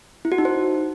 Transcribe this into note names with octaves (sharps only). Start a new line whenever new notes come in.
E4
F#4
D#4
C5